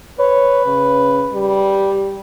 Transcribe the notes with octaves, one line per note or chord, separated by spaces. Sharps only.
B4 C#5
C#3
G3